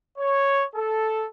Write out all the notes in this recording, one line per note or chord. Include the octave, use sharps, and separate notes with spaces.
C#5
A4